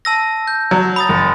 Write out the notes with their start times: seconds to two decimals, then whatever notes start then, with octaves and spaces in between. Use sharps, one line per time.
0.05 A5 E6 A#6
0.47 G6
0.71 F#3
0.96 B5 D#6 A6
1.09 F#1